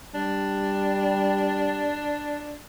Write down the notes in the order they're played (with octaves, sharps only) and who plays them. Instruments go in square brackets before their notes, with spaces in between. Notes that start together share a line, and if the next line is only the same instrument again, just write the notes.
[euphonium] G3 [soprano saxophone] D4